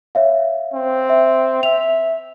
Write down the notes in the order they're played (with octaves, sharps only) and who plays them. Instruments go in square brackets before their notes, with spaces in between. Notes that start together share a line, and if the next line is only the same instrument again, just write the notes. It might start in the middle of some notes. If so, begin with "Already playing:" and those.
[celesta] C#5 E5 F5
[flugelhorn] C4
[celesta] E5
[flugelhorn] E5 [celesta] F7